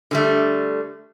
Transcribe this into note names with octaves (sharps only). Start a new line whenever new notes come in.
D3 G3 A3